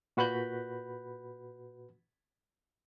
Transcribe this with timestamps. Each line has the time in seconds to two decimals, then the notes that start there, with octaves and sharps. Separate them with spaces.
0.17 A#2 F#4 B4 B5 F#6 G6